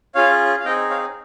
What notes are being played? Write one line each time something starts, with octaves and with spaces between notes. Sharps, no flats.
C#4 F4 G#4 C#5 F5
F5
C4 D#4 G#4 D#5 G5
C#5 F5